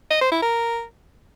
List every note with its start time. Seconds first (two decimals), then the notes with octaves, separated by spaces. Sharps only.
0.11 D#5
0.21 C5
0.32 E4
0.42 A#4